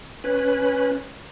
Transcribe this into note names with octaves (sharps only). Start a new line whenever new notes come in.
C#4 B4